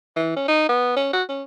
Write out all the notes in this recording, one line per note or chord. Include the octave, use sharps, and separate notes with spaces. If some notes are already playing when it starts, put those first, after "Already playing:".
E3
C#4
D#4
B3
C#4
F#4
C#4